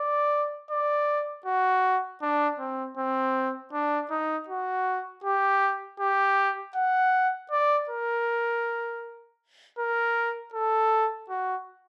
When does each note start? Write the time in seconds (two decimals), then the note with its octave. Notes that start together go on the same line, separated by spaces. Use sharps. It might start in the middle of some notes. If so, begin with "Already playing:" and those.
Already playing: D5
0.70 D5
1.46 F#4
2.22 D4
2.59 C4
2.97 C4
3.73 D4
4.10 D#4
4.48 F#4
5.24 G4
6.00 G4
6.75 F#5
7.51 D5
7.89 A#4
9.79 A#4
10.54 A4
11.29 F#4